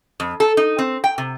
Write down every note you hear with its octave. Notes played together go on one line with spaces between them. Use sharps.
F2
A4
D#4
C4
G5
C3